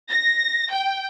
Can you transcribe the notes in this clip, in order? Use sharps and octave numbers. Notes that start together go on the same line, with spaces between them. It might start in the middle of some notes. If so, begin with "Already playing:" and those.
A#6
G5